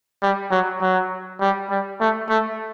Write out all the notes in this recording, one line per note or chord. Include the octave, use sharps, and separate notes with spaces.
G3
F#3
F#3
G3
G3
A3
A3